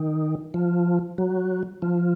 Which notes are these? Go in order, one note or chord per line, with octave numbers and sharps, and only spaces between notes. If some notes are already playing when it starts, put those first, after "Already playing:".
Already playing: D#3
F3
F#3
F3